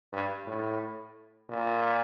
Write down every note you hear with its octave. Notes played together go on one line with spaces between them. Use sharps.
G2
A2
A#2